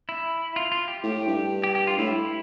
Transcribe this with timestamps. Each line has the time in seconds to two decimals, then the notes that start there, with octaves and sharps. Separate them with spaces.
0.09 E4
0.56 F4
0.72 F4
0.88 G4
1.03 A2
1.27 G2
1.64 G4
1.75 G4
1.87 F4
1.98 A2 E4